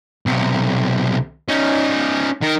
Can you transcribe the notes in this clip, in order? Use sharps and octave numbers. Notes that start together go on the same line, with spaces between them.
B1 C3
C#4 D#4
D#3 A#4